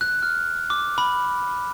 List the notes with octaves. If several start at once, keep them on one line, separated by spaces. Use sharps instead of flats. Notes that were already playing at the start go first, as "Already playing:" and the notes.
F#6
F6
D6
B5